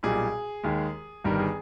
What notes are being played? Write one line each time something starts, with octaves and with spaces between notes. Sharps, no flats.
B1 A#2 G3 G#4
D#2 D#3 G#3
G1 G2 D#3 G3 A#4
G#4